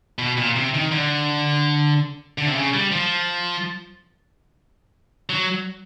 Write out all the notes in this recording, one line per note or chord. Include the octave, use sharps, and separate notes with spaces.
B2
A#2
C3
D#3
D3
D3
C3
C#3
G3
F3
F#3